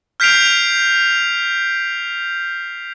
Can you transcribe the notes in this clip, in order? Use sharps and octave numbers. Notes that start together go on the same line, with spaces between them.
F6 G6 B6 C7 D7 F7